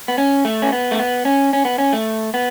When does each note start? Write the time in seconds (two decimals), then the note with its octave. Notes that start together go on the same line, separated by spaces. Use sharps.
0.08 B3
0.18 C#4
0.45 A3
0.62 C#4
0.72 B3
0.91 A3
0.99 B3
1.25 C#4
1.53 C#4
1.65 B3
1.78 C#4
1.93 A3
2.34 B3